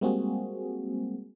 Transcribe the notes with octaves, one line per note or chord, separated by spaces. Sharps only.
G3 G#3 A#3 C4 F#4 G#4